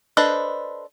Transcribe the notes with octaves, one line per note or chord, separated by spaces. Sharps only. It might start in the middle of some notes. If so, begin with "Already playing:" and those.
D4 A4 B4 C5 D#5